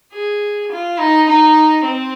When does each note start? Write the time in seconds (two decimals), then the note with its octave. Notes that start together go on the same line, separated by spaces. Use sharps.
0.13 G#4
0.71 F4
0.99 D#4
1.28 D#4
1.84 C4